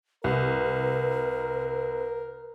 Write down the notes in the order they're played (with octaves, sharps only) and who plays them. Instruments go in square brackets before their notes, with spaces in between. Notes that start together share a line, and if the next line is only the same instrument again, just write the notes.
[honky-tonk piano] C2 [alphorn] A#4 [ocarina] B4